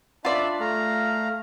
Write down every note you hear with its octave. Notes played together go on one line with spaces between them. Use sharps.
D4 F4 D5 E5 B5
A3 F5 A#5